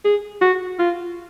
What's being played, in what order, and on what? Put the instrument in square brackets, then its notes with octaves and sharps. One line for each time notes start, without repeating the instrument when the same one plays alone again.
[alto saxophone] G#4
F#4
F4